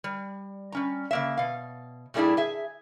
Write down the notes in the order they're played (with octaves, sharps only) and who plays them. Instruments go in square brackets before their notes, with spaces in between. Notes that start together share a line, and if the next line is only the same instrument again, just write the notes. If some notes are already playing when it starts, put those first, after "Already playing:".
[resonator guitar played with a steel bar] G3
G3 C#4 A#5
C#3 A#3 E5
B2 F5
A#2 G3 A3 D4 E4 G#4
G#4 E5